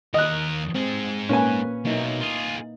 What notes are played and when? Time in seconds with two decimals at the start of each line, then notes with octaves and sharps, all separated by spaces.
0.14 D#2 A#4 D#5 F#6
0.75 G#2 C4 G#4
1.29 A#2 A#3 C#4 B4 G#5
1.85 B1 F#3 A#3 D#4 E4
2.20 F4 G#4